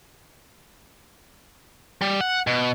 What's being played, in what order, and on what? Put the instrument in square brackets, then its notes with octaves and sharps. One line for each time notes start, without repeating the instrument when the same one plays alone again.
[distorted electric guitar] G3
F#5
B2